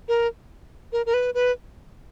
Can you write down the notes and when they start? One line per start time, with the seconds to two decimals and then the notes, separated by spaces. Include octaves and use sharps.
0.08 A#4
0.93 A#4
1.06 A#4
1.14 B4
1.34 B4